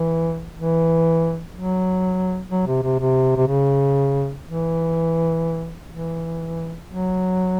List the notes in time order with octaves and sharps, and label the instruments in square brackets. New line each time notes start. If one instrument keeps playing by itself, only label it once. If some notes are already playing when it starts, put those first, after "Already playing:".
Already playing: [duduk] E3
E3
F#3
F#3
C3
C3
C3
C3
C#3
E3
E3
F#3